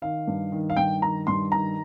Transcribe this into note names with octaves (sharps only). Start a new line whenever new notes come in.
D#3 F5
G2
D#3
F5
G2 G5
D#3 A#5
G2 C6
D#3 A#5